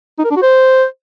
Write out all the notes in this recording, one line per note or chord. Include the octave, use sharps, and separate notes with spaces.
D#4
A#4
D4
F#4
C5